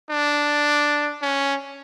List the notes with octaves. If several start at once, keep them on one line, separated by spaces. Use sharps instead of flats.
D4
C#4